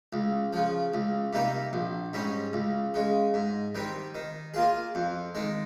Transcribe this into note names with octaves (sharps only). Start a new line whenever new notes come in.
C#2
C#3 F3
C#2
C3 G3 A#3 D#4
A#1
G#2 G3 C#4
C#2
C#3 G#3
G#2
D#3 G3 C4
D#3
A#3 F4 G#4
F2
D#3 G#3